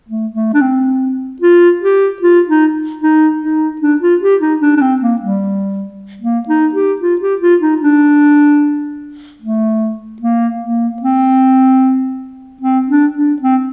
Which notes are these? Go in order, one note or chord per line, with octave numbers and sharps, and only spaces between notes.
A3
A3
D4
C4
F4
G4
F4
D#4
D#4
D#4
D4
F4
G4
D#4
D4
D4
C4
A#3
G3
A#3
D#4
G4
F4
G4
F4
D#4
D4
A3
A#3
A#3
C4
C4
D4
D4
C4